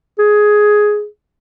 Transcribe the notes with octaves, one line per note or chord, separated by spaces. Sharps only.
G#4